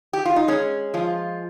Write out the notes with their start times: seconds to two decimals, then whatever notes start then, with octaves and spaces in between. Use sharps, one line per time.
0.13 G4
0.25 F4
0.36 D#4
0.48 G#3 C#4
0.94 F3 F4